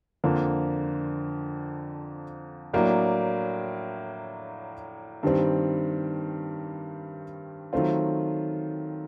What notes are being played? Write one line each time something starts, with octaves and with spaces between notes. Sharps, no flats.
F2 D3 F3 A#3
A2 F#3 A#3 D4
G2 D#3 G3 C4
D#3 F#3 A3 C4 F4